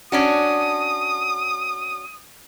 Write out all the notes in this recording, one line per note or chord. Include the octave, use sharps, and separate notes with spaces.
C#4 D4 F#4 D#6